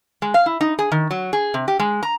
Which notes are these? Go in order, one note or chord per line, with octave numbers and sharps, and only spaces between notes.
G#3
F5
E4
D#4
G#4
D#3
F#3
G#4
C3
G4
G#3
A#5